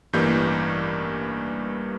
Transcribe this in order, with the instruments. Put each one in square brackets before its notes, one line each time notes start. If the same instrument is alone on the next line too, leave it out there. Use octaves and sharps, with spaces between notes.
[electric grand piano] A1 G2 E3 G3 A#3 G6